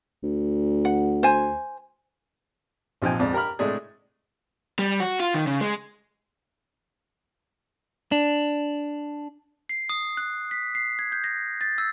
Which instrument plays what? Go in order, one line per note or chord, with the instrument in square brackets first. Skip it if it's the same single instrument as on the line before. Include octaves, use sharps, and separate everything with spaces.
[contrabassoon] D2
[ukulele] F#5
C5 G#5
[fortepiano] A#1 C3 F3 D#4 G5 G#5
F2 G#2 D5
G4 A#4 A#5 B5 F6
A2 C3 G#3 A3 D4 G#4
[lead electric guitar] G3
F#4
F4
D#3
C#3
G#3
[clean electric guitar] D4
[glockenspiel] C7
D#6
F#6
B6
C7
G#6
G6
A#6
A6
E6